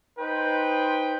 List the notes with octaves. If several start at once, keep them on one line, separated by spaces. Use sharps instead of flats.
D#4 B4 C5 G5